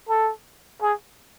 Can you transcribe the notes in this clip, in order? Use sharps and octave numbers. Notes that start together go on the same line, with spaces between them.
A4
G#4